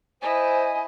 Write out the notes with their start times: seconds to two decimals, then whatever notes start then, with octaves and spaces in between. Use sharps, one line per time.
0.22 E4 C5 D#5 G#5